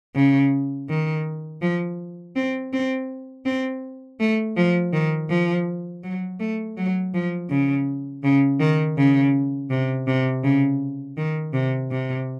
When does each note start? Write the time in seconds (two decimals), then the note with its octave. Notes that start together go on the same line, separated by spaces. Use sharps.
0.16 C#3
0.89 D#3
1.62 F3
2.36 C4
2.73 C4
3.46 C4
4.20 A3
4.56 F3
4.93 D#3
5.30 F3
6.03 F#3
6.40 A3
6.77 F#3
7.14 F3
7.50 C#3
8.24 C#3
8.60 D#3
8.97 C#3
9.71 C3
10.07 C3
10.44 C#3
11.17 D#3
11.54 C3
11.91 C3